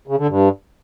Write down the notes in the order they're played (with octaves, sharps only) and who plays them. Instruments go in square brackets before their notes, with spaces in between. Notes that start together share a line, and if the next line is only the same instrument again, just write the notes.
[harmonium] C#3
D3
G2